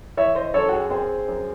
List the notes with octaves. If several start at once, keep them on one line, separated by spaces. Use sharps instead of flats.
E3 C#5 E5
C5 D#5
F#2 A4 C#5
F#4
G#4
C4 G#4 C5
F#2